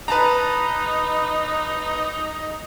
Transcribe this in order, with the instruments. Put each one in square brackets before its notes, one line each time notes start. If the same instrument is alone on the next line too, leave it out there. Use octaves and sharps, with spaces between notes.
[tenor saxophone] D#4 [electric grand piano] B4 A5 A#5